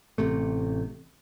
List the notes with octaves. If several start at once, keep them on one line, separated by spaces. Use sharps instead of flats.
A1 C3 A3